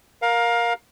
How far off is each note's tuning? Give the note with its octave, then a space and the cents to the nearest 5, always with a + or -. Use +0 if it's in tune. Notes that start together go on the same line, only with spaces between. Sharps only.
A#4 +10 F5 +20